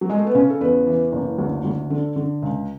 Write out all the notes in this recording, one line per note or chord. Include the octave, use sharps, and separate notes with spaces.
F#3
G#3
A3
B3
C#3 C#4
A4
E2 B4
E3
F#1
D2
D2
D3 A4
D3
C#2